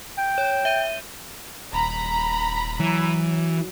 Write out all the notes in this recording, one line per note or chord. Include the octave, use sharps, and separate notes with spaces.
G5
C#5
E5 G6 D#7
D#1 A#5 B5
E3 F#3